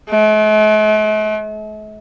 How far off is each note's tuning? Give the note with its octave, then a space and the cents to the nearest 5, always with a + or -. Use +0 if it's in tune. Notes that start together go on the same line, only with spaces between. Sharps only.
A3 -45